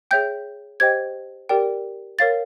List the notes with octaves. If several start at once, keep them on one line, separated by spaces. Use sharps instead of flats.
G#4 C#5 E5 G5 G6
G4 C5 D#5 G5 G#6
G4 A#4 D5 G5
A#4 C#5 F5 A6